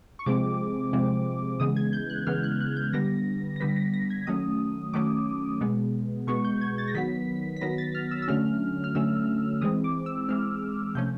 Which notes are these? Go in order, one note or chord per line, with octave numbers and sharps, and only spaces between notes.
C#6
C3 F3 G#3 C4 D6
C3 F3 G#3 C4
C#3 E3 G#3 B3 D#6
G#6
G6
F#6
C#3 E3 G#3 B3 F6
F#6
F#6
G6
D3 G3 B3 A#6
A#6
D3 G3 B3 B6
A#6
A#6
G#6
D#3 F#3 A3 C#4 D#6
D#3 F#3 A3 C#4 D6
B2 G#3 B3
B2 G#3 B3 C#6
G6
G#6
A6
A#6
D#3 F#3 B3 B6
B6
D#3 F#3 B3 A#6
A6
F6
E6
E6
D3 F#3 A3 C#4 F6
F6
D3 F#3 A3 C#4 E6
E3 G#3 C4 D#6
D6
E6
E3 G#3 C4 F6
C3 F3 A3 C#4 G6